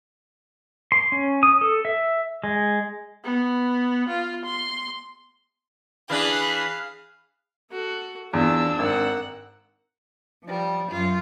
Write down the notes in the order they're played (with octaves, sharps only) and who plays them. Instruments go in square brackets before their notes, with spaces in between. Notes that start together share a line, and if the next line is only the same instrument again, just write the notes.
[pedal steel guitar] C6
C#4
D#6
A4
E5
G#3
[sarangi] B3
F4
C6
[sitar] E3 D4 [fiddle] G#4 [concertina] F5 [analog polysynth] B5 F#6
[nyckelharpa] F#4 A4
[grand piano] E2 [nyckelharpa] C4 F4 [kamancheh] D4 E6
[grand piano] G#1 [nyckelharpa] A#4 F#5
[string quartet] F3 G3
F#2 F4